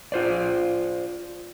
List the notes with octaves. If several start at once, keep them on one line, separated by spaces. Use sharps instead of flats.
F4 C5 D5